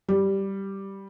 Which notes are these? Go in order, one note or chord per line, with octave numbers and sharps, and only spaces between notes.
G3